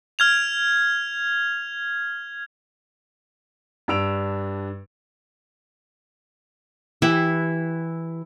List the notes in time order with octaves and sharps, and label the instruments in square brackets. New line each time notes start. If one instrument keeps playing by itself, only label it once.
[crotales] F6 G#6 F7
[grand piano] G2 D4 E6 D7 F7
[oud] E3 G4 [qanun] E4